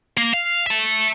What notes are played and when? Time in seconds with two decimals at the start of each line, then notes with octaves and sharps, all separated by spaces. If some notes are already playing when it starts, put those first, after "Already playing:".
0.17 A#3
0.33 F5
0.66 E5 A5